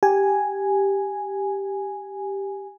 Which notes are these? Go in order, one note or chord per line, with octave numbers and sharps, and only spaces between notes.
G4 G#5